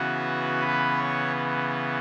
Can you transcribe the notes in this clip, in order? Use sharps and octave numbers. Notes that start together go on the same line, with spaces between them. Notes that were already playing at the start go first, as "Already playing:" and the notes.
Already playing: C#3 E3 B3 F#4
B4
C#5